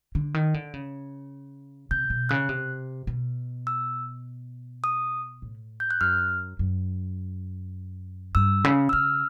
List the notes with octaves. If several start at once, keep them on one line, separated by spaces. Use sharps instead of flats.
D3
D#3
D3
C#3
C3 G6
B2
C#3 F#6
C3
B2
E6
D#6
A2
G6
F#6
F#2 F6
F#2
G2 E6
C#3
E6
C#3 F6